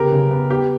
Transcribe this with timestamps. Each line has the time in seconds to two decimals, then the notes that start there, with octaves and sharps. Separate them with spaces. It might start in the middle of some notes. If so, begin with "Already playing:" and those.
Already playing: C#3 B3 G4 A#4
0.12 C#3
0.31 B3
0.50 B3 G4